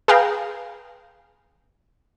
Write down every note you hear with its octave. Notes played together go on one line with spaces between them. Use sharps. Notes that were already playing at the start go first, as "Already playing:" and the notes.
G#4 B4 F5 G5 A#5